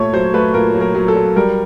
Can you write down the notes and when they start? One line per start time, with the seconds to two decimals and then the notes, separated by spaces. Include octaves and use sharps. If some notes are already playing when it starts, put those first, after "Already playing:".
Already playing: A#2 A3 C#5
0.13 F#3 C5
0.34 A3 B4
0.54 A#2 A#4
0.75 F#3
0.81 A#4
0.95 F#3
1.08 A4
1.15 F#3
1.36 G3 A#4